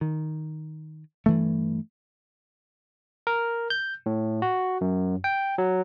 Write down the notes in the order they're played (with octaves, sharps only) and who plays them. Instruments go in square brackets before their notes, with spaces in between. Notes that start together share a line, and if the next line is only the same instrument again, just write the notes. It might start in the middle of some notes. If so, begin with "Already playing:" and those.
[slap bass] D#3
G2 E3 A3
[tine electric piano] A#4
G6
A2
F#4
F#2
G5
F#3